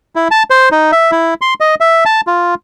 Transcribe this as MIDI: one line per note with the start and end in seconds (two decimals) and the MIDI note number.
0.16 0.28 64
0.31 0.43 81
0.50 0.69 72
0.72 0.91 63
0.92 1.11 76
1.12 1.34 64
1.41 1.54 84
1.60 1.75 75
1.80 2.04 76
2.05 2.21 81
2.27 2.55 65